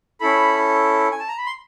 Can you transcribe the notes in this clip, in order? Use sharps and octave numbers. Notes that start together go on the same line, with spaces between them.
C#4 E4 A4 B5
G#5
A5
A#5
B5
C6